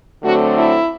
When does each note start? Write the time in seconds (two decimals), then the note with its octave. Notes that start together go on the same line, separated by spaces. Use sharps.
0.24 D3 F#3 A3 C4 F#4
0.58 E4